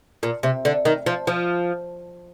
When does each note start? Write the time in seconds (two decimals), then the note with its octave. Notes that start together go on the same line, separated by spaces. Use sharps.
0.23 A#2
0.43 C3
0.65 D3
0.85 D#3
1.06 F3
1.27 F3